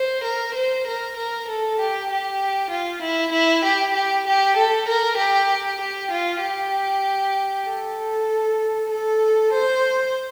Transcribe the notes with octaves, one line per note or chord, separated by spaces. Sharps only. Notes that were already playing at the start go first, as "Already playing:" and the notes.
Already playing: C5
A#4
C5
A#4
A#4
A4
G4
G4
F4
E4
E4
G4
G4
G4
A4
A#4
G4
G4
F4
G4
A4
A4
C5